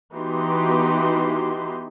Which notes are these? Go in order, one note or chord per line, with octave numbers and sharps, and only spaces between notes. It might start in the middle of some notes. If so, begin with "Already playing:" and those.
E3 B3 D#4 F#4 G4 C6